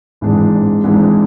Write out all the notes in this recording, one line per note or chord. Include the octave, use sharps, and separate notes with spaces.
G#1 G#2 E3 G#3 D4
G#1 G#2 E3 G#3 D4